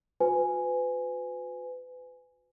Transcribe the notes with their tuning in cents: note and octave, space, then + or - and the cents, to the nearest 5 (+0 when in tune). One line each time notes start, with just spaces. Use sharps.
F#4 -45 B4 +30 G#5 +0